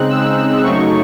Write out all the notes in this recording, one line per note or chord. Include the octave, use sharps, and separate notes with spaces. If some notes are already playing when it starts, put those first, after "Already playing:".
Already playing: C#3 G#3 C4 D#4 F#6
E6
F#2 C#3 F#3 A3 D#4 C#6